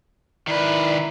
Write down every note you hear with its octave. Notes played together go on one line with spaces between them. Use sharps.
D#3 E4 B4 D5